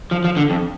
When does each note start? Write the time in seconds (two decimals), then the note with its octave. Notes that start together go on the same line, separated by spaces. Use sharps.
0.11 F3
0.24 F3
0.37 D3
0.50 F2